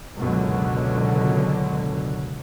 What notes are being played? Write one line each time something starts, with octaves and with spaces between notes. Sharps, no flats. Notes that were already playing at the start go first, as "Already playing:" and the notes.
C#2 F#2 B2 D3 F#3